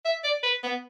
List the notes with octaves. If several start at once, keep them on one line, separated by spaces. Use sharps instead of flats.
E5
D5
B4
B3